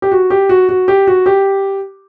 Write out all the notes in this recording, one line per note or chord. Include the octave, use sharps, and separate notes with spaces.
G4
F#4
G4
F#4
F#4
G4
F#4
G4